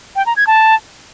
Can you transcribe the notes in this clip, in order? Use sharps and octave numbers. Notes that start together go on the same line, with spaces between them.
G5
A#5
G#6
A5